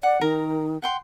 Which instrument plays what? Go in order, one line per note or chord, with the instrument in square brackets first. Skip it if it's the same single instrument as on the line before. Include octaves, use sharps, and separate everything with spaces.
[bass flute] D5 [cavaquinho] F#5
[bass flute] D#3 [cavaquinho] A#4 A#5
[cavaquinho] F#5 G5 C6